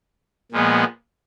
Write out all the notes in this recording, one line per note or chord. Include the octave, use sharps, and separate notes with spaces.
A#2 F3 G#3 B3